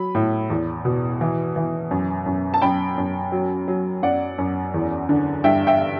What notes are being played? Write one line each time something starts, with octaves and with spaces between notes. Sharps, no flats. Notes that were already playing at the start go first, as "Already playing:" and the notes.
Already playing: F#3 B5
A2
E2
B2
E3
E3
F#2
F#2
A5
F#2 G5 B5
F#2
F#3
F#3
F#2 D5 F#5
F#2
E2
D3
G2 E5 G5
E5 G5